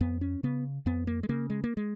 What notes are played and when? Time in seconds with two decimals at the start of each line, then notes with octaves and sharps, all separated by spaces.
0.01 F2 B3
0.21 C#4
0.43 C#3 B3
0.86 F2 B3
1.07 A#3
1.23 G#3
1.29 C#3 A#3
1.50 G#3
1.64 A#3
1.77 G#3